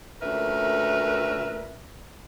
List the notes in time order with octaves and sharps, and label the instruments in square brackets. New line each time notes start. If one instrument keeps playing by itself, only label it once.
[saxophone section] D2 A#2 C#4 A#4 B4 E5